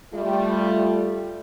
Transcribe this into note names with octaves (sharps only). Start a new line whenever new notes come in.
G3 A3 F4